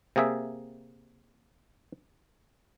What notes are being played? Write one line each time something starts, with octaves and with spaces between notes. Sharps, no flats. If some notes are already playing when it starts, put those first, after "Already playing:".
C3 A#3 G#4 E5